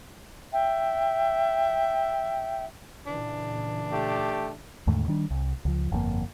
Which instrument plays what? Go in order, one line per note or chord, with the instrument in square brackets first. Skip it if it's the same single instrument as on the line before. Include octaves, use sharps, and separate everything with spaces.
[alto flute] E5 [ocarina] G5
[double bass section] A#2 C#3 E3 [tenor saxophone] D4
[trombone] A3 [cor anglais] G4
[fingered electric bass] D#2 G#2 D3 A3
D#3 G3 D4
C2
C#2 F3
G1 F2 C3 A#3